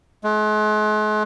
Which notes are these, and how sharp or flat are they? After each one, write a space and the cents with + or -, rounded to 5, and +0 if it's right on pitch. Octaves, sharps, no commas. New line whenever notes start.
G#3 +45